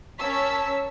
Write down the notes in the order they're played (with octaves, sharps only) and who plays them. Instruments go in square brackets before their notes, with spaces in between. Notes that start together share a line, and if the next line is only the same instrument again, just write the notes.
[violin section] C#4 A#4 C#5 A5 E6 B6